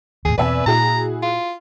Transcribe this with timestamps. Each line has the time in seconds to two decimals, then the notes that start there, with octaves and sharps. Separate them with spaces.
0.25 D#2 A2 G#4
0.38 E2 B2 C4 B4 D5 E5 G#5
0.66 A#2 E4 F#4 G#4 A#5
1.22 F4